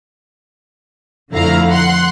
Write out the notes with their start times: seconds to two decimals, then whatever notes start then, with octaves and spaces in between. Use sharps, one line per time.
1.31 F2 D3 A3 E4 F5 A#5
1.69 F#5 C6 F#6